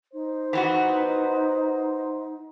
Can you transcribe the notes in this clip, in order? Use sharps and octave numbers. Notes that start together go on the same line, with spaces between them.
D#4 C5
E3 B3 F#4